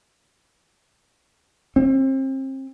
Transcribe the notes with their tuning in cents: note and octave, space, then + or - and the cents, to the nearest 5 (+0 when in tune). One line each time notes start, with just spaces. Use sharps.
C4 +35